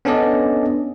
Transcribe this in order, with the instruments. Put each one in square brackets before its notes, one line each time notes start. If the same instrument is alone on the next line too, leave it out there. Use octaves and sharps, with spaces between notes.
[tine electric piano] B3 C#4 D4 A4 D5 D#5